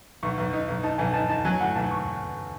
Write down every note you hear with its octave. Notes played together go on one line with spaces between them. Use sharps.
B1 C#6
B1
D#4
B1
D#4 A5
B1 G#5
D#4 A5
D#4 A5
F#3 G#5
A2 F#5
B1 A5
C#6